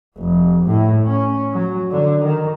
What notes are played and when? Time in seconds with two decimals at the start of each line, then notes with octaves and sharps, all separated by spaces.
0.18 F1
0.67 A2
1.06 C#4
1.53 F#3
1.91 D3
2.24 D#3